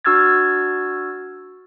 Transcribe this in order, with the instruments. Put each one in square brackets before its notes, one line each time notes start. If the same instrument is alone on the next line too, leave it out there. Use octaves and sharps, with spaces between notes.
[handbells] D4 F#4 E6 F6 G#6 A6